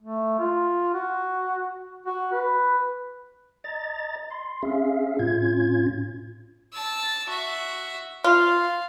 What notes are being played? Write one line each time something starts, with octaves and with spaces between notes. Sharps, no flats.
A3
F4
F#4
F#4
B4
D#5 A#5 A6
C6
C#4 G#4 E5 F5
A2 C#4 F4 G#6
A5 E6
F#4 E5
F4 F5